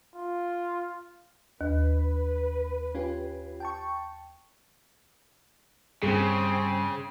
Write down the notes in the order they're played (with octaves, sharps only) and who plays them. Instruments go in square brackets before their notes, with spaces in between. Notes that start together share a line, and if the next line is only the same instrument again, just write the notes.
[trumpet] F4
[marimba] D#2 [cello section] B4
[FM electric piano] C#4 F4 G4
G5 A5 C#6
[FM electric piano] G2 G3 G#4 [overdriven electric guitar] C#3 [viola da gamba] C4